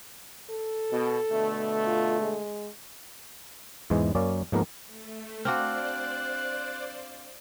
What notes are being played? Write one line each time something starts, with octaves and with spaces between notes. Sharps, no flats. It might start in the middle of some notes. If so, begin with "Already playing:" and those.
A4
B2
B2 D3 A3
F4
G#3
E2 G#2 E3 G#3
F#2 A#3 C#4 D5
G#2 F3 A#3 B3 A#4
A3
C4 D4 F#4 C5 D5 F5 F6 F#6